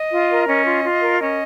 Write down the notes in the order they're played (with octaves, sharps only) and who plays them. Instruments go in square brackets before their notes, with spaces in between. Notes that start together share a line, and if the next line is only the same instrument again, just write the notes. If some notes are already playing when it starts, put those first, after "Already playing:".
Already playing: [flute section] D#5
F4
A#4
C#4 D#5
F4
F4
A#4
C#4 D#5